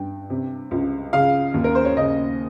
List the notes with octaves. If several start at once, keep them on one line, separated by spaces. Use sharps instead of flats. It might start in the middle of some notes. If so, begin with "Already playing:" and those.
Already playing: G2 G5
C3
C#2
C#3 F5
D#2
A#4
C5
C#5
C#3 D#5